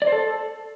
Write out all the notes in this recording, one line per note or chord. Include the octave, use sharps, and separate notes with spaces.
D5
C5
A4